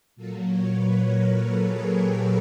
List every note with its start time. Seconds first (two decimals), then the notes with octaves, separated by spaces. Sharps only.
0.16 A#2 F#3 A#3 A4
0.45 C#5
0.74 B4
1.03 A#4
1.33 A4
1.61 G#4
1.91 G4